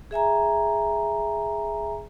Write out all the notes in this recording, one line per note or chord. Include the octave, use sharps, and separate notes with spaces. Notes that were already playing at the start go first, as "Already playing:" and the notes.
G#4 E5 G#5 A#5